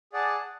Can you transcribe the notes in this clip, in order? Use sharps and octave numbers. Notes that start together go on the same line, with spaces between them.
G#4 D5 F#5 A5